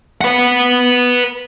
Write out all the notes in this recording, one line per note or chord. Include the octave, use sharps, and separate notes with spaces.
B4 F#5